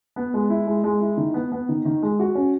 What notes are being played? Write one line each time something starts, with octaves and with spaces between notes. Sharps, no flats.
B3
G#3
E4
G#3
G#3
E4
D#3
B3
B3
D#3
D#3
G#3
F#4
C#4